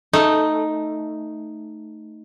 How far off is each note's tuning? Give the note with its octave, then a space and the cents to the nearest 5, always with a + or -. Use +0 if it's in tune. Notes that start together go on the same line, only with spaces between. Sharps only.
A3 +0 D#4 +0